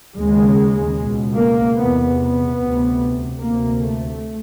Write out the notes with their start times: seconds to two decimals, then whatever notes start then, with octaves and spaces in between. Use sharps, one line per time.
0.17 D#2 C#3 G#3
0.98 C#2 B2
1.38 A#3
1.79 E2 C3 B3
2.19 B3
2.59 D2 C3
3.39 D2 C3 A#3
3.80 A3